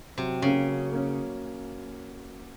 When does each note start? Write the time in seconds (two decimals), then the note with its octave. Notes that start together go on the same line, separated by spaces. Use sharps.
0.18 C3 F#3
0.42 C#3 A#3 C#4
0.67 F#3
0.92 A#3 C#4